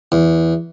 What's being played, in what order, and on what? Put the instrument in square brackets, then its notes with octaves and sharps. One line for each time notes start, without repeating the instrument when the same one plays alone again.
[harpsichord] E2